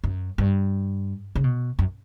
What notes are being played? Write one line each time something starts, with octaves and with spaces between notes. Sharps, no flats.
F#2
G2
C#3
B2
F#2